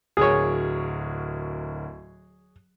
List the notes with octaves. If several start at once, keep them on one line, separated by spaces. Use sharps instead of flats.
D1 F#4 G#4 A#4 C#5